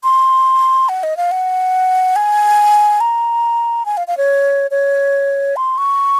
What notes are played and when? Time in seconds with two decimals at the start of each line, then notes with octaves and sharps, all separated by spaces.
0.04 C6
0.89 F#5
1.03 D#5
1.17 F5
1.31 F#5
2.16 G#5
3.01 A#5
3.86 G#5
3.97 F5
4.08 F5
4.17 C#5
4.71 C#5
5.56 C6
5.78 C#6